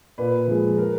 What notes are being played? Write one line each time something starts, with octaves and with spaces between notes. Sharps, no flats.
A#2 B4
F3 G#3
A#4